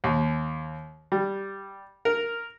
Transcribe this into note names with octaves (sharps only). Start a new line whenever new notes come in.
D#2
G3
A#4